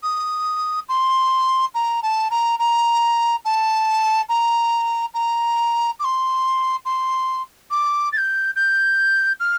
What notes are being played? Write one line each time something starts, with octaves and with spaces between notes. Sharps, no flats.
D#6
C6
A#5
A5
A#5
A#5
A5
A#5
A#5
D6
C6
C6
D6
A6
G6
G6
F6